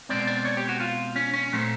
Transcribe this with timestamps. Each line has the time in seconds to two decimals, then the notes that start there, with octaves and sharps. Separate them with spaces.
0.09 B2 G#3 C4 D5
0.27 D5
0.45 C#5
0.57 G4
0.69 F#4
0.80 F4
1.16 C#4
1.34 C#4
1.52 A#2 F#3 A3 C4